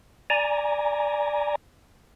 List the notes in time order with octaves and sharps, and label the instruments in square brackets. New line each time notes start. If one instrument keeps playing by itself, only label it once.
[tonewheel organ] D5 G#5 A#5